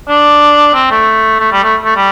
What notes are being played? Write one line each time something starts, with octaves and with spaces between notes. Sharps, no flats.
D4
C4
A3
A3
G3
A3
A3
G3